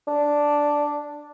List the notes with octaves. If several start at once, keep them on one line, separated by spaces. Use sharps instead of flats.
D4